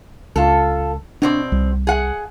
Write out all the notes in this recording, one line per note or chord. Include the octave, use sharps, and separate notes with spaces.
C#2 F4 A4
B2 C4 D4 D5
C2
G#4 F#5